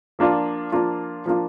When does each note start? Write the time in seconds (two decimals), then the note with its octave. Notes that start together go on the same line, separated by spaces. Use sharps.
0.19 F3 A#3 D4 F4
0.72 F3 A#3 D4 F4
1.26 F3 A#3 D4 F4